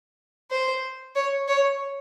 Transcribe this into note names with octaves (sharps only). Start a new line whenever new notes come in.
C5
C#5
C#5